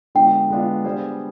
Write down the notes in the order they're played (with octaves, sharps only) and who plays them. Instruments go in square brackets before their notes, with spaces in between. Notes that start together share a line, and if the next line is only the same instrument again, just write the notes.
[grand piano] D3 G#3 B3 D4 F4 [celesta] G5
[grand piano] D3 G#3 B3 D4 F4
G3 B3 D4 G#4 C5